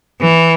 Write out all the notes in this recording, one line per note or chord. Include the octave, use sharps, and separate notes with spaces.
E3